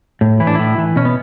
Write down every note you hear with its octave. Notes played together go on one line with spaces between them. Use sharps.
A2
E3 E4
D4
A2 E4
E3
B2 C#4
B3